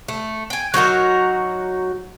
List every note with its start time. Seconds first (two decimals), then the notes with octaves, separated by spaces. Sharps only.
0.08 A3
0.50 G5 G#5
0.74 F#3 D#4 F#4 A#4